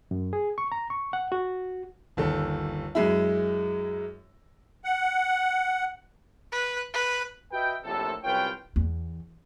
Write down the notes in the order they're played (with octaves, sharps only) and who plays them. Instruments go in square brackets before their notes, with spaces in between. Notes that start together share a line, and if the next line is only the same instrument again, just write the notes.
[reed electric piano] F#2
G#4
C#6
A#5
C#6
F#5
F#4
[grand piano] G1 D#2 A4
F#2 G#3 E4
[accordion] F#5
[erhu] B4
B4
[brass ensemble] F#4 B4 D#5 E5 G5
A#1 A2 C3 A4
C2 F#2 F4 B4 C#5 G5
[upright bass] E2